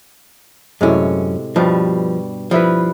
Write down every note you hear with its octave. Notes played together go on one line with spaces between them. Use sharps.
F#2 A2 C3 G#3 C#4
G2 B2 F3 G3
F3 G3 E4 B4